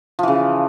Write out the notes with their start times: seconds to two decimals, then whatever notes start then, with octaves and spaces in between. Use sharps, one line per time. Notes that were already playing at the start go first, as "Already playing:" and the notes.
0.19 F3
0.23 E3
0.28 C#3